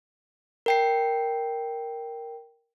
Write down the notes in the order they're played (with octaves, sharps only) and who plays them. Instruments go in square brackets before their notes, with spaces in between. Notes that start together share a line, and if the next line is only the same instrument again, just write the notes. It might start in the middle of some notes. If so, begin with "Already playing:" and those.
[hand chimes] A#4 G5 C7